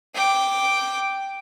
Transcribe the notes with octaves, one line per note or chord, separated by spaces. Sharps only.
G5 D6